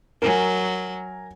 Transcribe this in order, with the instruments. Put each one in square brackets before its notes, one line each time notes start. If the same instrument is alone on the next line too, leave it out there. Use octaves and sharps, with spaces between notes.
[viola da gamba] F#3 [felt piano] A#4 G#5